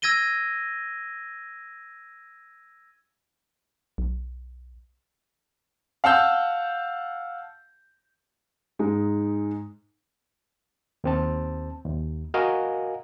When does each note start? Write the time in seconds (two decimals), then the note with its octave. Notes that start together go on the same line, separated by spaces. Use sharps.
0.02 E6 G#6 A#6 D#7 G7
3.98 B1
6.04 F5 F#5 A5 E6 G6
8.79 G#2 G#3 D#4
11.04 D#2 C4 A5
11.85 D#2
12.34 F#4 A#4 D#5 F5 G#5